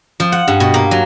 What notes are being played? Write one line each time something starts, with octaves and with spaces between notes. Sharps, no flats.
F3
F#5
G2
B2
A#3
F#3